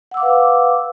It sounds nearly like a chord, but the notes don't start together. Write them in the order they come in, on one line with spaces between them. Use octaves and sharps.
F#5 E6 D6 F5 B4